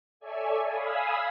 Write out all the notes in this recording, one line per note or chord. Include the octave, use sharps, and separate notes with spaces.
A4 C#5 D5 E5 G#5
F5 G#5 B5 D#6 E6